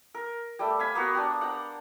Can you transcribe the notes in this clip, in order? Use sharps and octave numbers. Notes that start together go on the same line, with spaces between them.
A#4
G3 A3
F5 G#5 B5
A#3 B3 F#4
D4 G4
F#5 G5 A#5